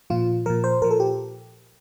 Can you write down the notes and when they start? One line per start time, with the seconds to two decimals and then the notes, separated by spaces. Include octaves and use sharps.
0.10 A#2 F3 F4
0.46 A#2 F3 A#4
0.64 C5
0.82 A#2 F3 A#4
0.91 A4
1.00 G4